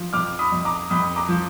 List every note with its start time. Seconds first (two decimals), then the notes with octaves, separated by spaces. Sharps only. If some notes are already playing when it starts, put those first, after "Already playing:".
Already playing: F3
0.13 F2 D6 F6
0.39 B5 D#6
0.52 F2
0.65 A#5 D6
0.90 F2 B5 D#6
1.16 A#5 D6
1.29 F3